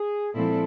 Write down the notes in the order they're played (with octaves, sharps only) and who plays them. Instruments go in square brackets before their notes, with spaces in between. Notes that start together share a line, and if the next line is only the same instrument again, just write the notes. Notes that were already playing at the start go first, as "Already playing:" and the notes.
Already playing: [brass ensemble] G#4
[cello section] A#2 F3 G#3 C4 E4 [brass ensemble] A4